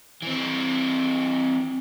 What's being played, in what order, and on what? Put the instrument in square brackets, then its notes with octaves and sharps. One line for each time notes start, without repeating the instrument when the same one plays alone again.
[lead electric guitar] E3 C4